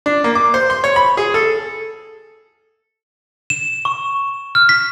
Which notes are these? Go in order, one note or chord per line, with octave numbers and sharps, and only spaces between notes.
D4
A#3
D6
C5
C6
C#5
B5
G#4
A4
E7
C#6
F6
B6